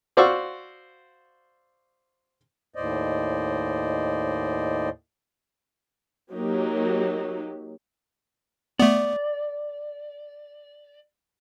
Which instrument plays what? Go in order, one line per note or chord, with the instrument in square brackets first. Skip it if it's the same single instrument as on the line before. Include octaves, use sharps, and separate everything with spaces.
[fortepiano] F#4 C5 D5 F5 C#6 E6
[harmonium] D#2 A2 C5 D5 D#5
[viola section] F#3 A#3 D#4 G4
[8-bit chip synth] A3 B3 [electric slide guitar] D5